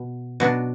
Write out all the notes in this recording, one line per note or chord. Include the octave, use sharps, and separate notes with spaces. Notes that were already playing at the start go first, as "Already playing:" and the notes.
Already playing: B2
B2 F#3 B3 D4